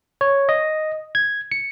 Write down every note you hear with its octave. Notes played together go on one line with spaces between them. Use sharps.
C#5
D#5
G#6
C#7